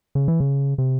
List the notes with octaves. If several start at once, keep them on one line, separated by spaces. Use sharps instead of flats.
C#3
E3
C#3
C3